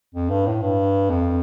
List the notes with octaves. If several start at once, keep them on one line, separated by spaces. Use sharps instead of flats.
F2
G2
A2
G2
F2